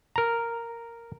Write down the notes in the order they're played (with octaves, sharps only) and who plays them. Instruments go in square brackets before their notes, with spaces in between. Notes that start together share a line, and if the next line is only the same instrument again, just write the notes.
[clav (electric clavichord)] A#4 A#5